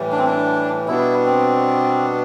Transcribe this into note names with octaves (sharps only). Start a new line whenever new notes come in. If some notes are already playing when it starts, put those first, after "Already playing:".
Already playing: A2 E3 G3
D4
C4
D4
B2 G3 B3 D4 E4
C4